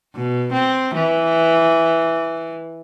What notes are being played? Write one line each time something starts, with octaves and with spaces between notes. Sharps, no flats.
B2
C4
E3